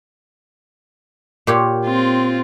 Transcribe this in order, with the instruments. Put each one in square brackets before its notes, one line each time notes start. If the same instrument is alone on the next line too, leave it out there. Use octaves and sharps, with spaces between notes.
[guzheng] A#2 G4 C#5
[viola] C4 F4